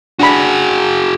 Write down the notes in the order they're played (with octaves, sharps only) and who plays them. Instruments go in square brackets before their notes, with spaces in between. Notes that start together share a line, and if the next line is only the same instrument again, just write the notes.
[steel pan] D4 B5 [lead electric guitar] F#4 G#4